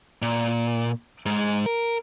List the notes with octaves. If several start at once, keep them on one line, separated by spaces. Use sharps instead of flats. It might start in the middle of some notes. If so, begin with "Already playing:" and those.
A#2
G#2 G#3
A#4